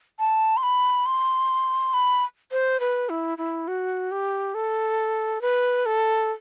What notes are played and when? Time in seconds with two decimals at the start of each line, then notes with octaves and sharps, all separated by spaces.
0.19 A5
0.57 C6
0.63 B5
1.06 C6
1.93 B5
2.52 C5
2.80 B4
3.09 E4
3.38 E4
3.68 F#4
4.11 G4
4.54 A4
5.41 B4
5.86 A4